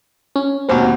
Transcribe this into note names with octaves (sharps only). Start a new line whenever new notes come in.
C#4
G#1 D#2 B2 C4 F#4